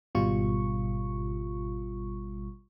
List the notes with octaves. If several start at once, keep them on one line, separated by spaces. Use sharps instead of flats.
G#1 B2 G3 F4 C#6